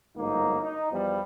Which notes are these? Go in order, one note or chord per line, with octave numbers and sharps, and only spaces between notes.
G1 G#2 F#3 A#3 D#4
D#4
E2 F3 G3